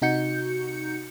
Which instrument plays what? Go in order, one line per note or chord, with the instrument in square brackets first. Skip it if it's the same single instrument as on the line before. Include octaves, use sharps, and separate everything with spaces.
[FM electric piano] C3 D#4 F#4 G6 C#7